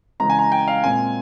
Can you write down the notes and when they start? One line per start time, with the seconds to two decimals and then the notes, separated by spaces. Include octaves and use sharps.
0.20 C#3 E3 G#3 A#5
0.30 G#5
0.39 A#5
0.52 G5
0.68 F5
0.84 A#2 G#3 C4 G#5